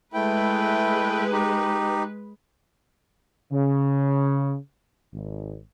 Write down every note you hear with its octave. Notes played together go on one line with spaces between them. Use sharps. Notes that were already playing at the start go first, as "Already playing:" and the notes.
G#3 A3 E4 B4 G5
D#4 G4
C#3
G#1